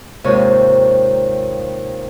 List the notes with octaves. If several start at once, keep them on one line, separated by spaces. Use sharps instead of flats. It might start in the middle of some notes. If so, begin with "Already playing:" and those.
D#2 G#2 C3 F3 C#5